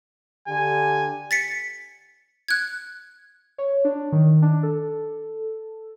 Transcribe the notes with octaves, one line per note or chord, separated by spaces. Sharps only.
D3 G4 G#5
A6 B6 C#7
F#6 G#6
C#5
D4
D#3
D4
A4